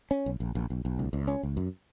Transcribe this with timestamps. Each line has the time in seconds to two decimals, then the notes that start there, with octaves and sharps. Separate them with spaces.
0.11 C#4
0.26 B1
0.40 A#1
0.55 A#1
0.70 B1
0.85 B1
0.99 C#2
1.13 C#2
1.28 C#4
1.43 C#2
1.57 F#2